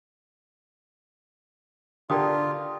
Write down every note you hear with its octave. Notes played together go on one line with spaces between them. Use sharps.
D3 F4 G4 A#4 D5 G5 D#6